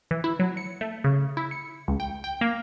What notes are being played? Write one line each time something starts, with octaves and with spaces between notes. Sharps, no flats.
E3
E4
F#3
C#7
A3
C#3
E4
C#7
C#2
G5
G5
A#3